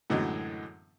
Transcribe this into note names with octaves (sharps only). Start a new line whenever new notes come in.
F#2 A2 D3 E3 F#3 G#3